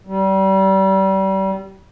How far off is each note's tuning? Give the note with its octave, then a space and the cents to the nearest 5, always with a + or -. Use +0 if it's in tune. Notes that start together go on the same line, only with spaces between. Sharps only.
G3 -30